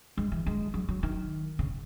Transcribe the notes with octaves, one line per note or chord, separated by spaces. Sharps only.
G#3
E3
G#3
F#3
F#3
D#3
C#3